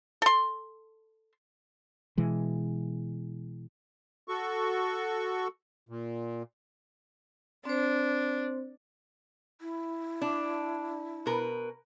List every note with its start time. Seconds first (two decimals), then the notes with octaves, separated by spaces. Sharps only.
0.22 A4 C6
2.17 B2 E3 G#3
4.28 F#4 A4 C#6
5.89 A#2
7.65 C4 D4 C5
9.61 E4
10.21 D4
11.26 B2 A#4 B4